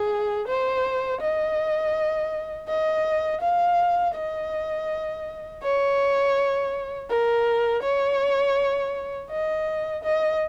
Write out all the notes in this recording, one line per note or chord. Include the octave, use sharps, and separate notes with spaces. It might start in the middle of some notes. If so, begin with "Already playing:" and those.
Already playing: G#4
C5
D#5
D#5
F5
D#5
C#5
A#4
C#5
D#5
D#5